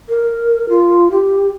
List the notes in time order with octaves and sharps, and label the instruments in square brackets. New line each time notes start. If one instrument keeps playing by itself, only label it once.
[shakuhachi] A#4
F4
G4